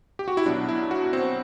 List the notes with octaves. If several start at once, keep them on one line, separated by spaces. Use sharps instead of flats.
G4
F#4
E4
B2 F#3 D4
E4
F#4
C4